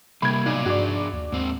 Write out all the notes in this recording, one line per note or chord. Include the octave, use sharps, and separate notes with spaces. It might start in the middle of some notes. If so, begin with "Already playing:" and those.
C3 G3 A#3 B5 G#6
B1 A#3 D5 F5
G2 D4 F#4 G#4 D5
D#2
D#2 G#2 C4